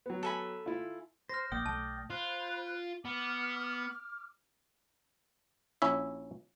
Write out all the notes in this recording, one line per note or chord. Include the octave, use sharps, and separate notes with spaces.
F#3 B3
A4 G#5 B5
E4 F4
C5 F6 A#6
A#1 A#3 D5 G5 D#6
B1 A3 A5
F4 C5 B5 F#6
B3 D6 F6
A#1 C#4 E4 E5